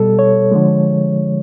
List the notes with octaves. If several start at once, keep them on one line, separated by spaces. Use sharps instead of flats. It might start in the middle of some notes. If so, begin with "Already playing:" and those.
Already playing: B2 G3 A4
C#5
D3 F3 G#3